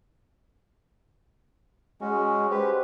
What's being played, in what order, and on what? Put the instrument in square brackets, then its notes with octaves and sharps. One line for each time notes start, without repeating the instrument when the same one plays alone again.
[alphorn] G#3 [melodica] C#4 F#4
[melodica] G4 B4 [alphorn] C5